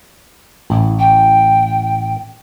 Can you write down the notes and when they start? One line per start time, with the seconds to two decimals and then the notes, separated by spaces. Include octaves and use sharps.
0.70 A1 E4
0.98 G5